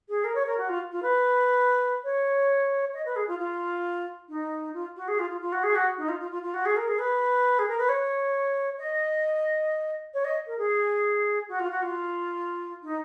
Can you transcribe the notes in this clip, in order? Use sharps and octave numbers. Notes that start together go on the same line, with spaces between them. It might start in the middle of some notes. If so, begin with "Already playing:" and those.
G#4
A#4
C#5
A#4
F#4
F4
F4
B4
C#5
D#5
B4
G#4
F4
F4
D#4
F4
F#4
G#4
F4
F4
F4
F#4
G#4
F#4
D#4
F4
F4
F4
F4
F#4
G#4
A#4
G#4
B4
G#4
A#4
B4
C#5
D#5
C#5
D#5
A#4
G#4
F#4
F4
F#4
F4
D#4